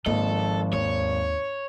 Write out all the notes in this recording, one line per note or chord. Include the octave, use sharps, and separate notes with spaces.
G#1 F3 A#3 A4 D#5
D#2 C#5